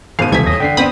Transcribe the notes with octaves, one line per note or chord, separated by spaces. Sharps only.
G#1 B2 F5 D#7
D#1 C#2 C3 E3 G#6 B6
E2 C#5 D#6 A#6
D3 G5 B6 C7
B3 C4 D4 B5 D#6